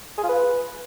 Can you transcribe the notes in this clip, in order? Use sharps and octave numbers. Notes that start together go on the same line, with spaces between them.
G#4
F4
B4